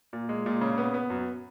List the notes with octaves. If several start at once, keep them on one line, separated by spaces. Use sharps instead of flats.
A#2
G#3
A#2
C#3
B3
B3
F#2